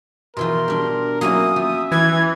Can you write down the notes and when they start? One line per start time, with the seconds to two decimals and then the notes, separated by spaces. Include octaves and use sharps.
0.37 B2 E3 F3 A#4 C6
0.68 G3 D4
1.21 F#3 A#3 C#4 E4 D#6
1.56 F3 E5
1.92 E3 G#6